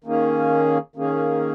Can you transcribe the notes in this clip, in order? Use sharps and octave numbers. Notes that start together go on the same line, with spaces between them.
D#3 A#3 C#4 G#4
D#3 A#3 C#4 G#4